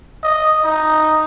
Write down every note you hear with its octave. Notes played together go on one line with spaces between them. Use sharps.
D#5
D#4